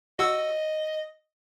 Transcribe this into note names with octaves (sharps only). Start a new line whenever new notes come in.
F#4 D#5 F#5 E6